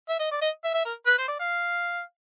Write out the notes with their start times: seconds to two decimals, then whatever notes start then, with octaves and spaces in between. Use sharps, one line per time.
0.09 E5
0.19 D#5
0.31 D5
0.41 D#5
0.64 E5
0.74 E5
0.85 A#4
1.06 B4
1.18 C5
1.28 D5
1.40 F5